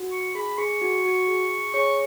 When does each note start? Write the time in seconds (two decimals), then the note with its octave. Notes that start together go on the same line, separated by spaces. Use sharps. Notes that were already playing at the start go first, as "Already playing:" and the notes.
Already playing: F#4
0.12 C#6
0.35 G#4 B5
0.58 G#4 C#6
0.82 F#4
1.05 F#4
1.28 G#4
1.74 G#4 C#5 C#6